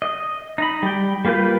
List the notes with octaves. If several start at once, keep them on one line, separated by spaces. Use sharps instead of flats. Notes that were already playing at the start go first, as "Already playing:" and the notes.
D#5
D#4 B5
G3 G5
G3 A#3 F4 B4 G6